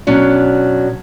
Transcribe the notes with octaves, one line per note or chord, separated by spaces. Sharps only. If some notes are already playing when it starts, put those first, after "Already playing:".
B2 F#3 C#4 D4